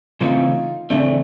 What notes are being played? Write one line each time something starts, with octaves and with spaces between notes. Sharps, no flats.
C#3 E3 A3 C4 D#4 F4
C#3 E3 A3 C4 D4 E4